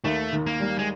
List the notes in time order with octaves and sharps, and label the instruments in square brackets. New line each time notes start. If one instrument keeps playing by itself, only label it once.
[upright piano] D#2 [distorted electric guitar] A3
[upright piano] D#3
[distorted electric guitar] A#3
[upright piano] G3
[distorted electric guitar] G#3